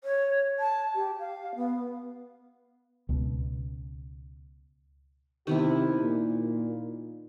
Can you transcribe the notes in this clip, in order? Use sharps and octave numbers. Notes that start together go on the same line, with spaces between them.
C#5
A5
G4
F5
B3
C#2 B2
C3 D#3 B3 E4 G4
A#2